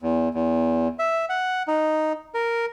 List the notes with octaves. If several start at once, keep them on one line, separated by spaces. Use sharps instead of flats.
E2
E2
E5
F#5
D#4
A#4